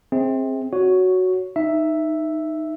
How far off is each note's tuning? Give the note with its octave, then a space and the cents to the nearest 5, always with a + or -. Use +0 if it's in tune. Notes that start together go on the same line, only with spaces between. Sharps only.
C4 +20 G#4 +0 E5 -40
F#4 +0 C#5 +10
D#4 -5 E5 +0